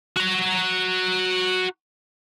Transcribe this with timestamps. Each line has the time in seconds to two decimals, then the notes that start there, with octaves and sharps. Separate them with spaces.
0.16 F#4 A#5